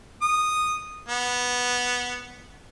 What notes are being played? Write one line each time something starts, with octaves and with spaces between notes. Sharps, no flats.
D#6
B3